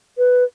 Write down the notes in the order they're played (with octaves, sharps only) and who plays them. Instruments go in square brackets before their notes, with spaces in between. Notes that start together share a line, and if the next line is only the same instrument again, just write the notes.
[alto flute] B4